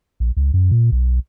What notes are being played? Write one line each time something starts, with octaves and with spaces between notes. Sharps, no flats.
A#1
C#2
F#2
A#2
B1